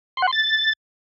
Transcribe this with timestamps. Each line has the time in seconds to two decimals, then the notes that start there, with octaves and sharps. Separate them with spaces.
0.17 C6
0.22 F#5
0.27 C6
0.33 A6